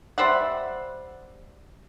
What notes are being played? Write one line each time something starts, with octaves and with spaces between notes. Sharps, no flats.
G3 C5 E5 F#5